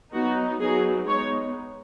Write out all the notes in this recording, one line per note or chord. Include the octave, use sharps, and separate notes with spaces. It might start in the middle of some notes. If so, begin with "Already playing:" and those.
F#3 B3 D#4 F#4
F#3 B3 D#4 G#4
G#3 B3 D#4 C#5